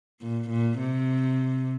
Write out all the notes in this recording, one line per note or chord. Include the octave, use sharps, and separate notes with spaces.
A#2
A#2
C3